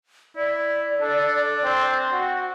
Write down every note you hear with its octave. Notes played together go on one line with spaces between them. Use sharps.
E4 D5
D4 A4
C4
F#4